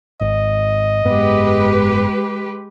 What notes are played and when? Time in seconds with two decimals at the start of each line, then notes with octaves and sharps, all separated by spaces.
0.21 G#1 D#5
1.05 F#1 G#2 G#3 B3 G4 B4